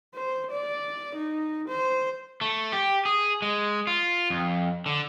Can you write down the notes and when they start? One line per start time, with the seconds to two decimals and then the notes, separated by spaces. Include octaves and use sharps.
0.14 C5
0.51 D5
1.15 D#4
1.68 C5
2.41 A3
2.72 G4
3.05 G#4
3.42 G#3
3.87 F4
4.30 F2
4.86 D3